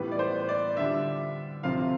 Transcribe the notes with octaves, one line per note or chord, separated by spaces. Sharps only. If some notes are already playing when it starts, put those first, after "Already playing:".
Already playing: A2 E3 G3 B3 F4 B4
D5
C5
D5
D3 G3 D4 F4 E5
D2 C3 F3 C4 F4 F5